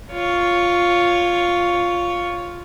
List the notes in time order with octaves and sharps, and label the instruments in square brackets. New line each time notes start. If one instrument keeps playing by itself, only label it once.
[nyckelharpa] F4 C#5